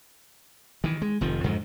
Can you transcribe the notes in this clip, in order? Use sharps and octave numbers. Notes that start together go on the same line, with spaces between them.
D#3 E3
G#3
F1 F2 D#3 F3
F2 G#2 D3 D#3